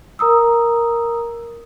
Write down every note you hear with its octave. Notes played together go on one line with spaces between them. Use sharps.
A#4 A#5 D#6 E6